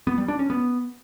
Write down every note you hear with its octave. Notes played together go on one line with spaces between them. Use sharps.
B3
G3
D4
C#4
B3